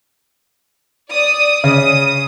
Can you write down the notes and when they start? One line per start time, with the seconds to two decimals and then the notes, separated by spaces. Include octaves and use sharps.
1.11 D5 D#6
1.64 C#3 D#6